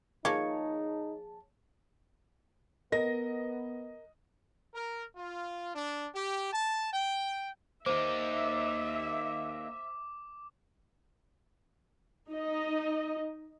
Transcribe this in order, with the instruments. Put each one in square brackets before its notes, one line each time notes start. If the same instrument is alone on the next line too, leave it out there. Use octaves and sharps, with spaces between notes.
[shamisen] F3 A#3 [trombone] D#4 [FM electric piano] G#4 A5 [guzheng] C#5
[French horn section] B3 [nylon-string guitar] A#4 [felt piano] D#5 A#6
[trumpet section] A#4
F4
D4
G4
A5
G5
[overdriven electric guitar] A#3 D#4 [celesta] C5 [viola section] E5 [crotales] D6
[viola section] D#4 D#5